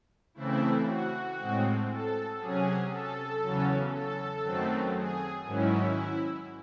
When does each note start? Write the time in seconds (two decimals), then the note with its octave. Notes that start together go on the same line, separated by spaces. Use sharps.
0.34 C#3 E3 A3 C4 E4
0.86 F#4
1.36 A2 G#3 C4
1.88 A4
2.39 C3 F#3 C#4 G#4
2.90 A4
3.41 E2 C#3 F#3 C#4
3.92 A4
4.43 F#2 D#3 F#3 A3 C4
4.94 G#4
5.45 G#2 D#3 F#3 C#4 E4